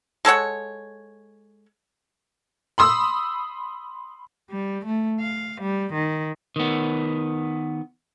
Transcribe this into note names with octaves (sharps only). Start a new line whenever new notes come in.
G#3 A4 C#5 F#5
B5 C6 D#6 E6
G3
A3
F5
G3
D#3
D#3 B3